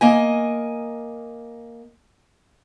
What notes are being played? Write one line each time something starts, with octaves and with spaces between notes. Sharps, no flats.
A#3 D#5 G#5